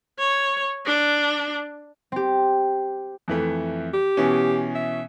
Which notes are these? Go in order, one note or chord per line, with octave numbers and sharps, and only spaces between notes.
C#5
D4
C4 G4
F2 E3 A3
G4
B2 E3 C#4
E5